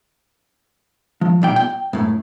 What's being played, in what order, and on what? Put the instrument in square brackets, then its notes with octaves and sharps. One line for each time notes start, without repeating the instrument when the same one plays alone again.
[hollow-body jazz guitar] F3
B1 A#2 G5
G5
F#2 A2